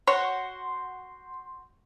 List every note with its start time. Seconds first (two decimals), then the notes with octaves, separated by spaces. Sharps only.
0.07 F#4 C5 C#5 F#5 C6